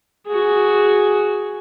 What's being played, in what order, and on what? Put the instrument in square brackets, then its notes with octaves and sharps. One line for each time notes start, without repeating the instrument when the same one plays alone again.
[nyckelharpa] F#4 G#4